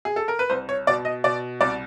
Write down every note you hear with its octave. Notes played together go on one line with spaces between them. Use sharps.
G#4
A4
A#4
B4
C2 C5
C#5
B2 D5
D#5
B2 D5
C2 D5